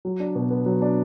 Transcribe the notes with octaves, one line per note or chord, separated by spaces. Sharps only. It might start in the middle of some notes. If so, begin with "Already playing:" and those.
F#3
D4
B2
B3
F#3
D4